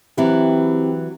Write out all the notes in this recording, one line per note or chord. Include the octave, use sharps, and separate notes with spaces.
E3 F#3 C4 E4 G4